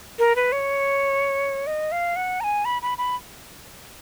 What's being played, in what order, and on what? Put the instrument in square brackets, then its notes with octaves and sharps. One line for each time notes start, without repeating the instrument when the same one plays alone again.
[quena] A#4
B4
C#5
D#5
F5
F#5
A#5
G#5
B5
B5
B5